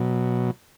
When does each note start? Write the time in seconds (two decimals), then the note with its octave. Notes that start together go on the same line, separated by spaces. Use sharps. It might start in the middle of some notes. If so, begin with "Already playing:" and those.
Already playing: B2 F#3